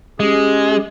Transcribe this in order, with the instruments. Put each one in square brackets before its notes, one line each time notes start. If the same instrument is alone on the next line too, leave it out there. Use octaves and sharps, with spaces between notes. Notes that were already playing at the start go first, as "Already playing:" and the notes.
[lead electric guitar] G#3 [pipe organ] C#4 G4 G#4